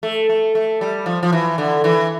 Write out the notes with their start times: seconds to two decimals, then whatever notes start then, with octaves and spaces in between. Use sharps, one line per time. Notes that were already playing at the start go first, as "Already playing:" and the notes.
0.03 A3
0.29 A3
0.55 A3
0.81 G3
1.06 F3
1.23 F3
1.33 E3
1.58 D3
1.84 E3